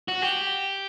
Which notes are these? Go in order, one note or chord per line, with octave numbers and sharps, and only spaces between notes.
F#4
G4